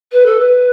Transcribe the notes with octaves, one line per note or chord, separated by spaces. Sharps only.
B4
A4
B4